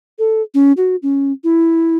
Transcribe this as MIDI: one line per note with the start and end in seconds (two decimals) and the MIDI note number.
0.19 0.42 69
0.54 0.72 61
0.77 0.96 66
1.03 1.32 61
1.44 1.98 64